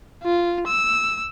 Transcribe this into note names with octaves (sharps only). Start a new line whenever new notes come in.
F4
E6